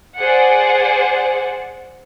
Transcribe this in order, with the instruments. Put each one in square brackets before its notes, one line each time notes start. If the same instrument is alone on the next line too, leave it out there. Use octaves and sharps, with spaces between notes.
[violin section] G#4 C5 D5 F#5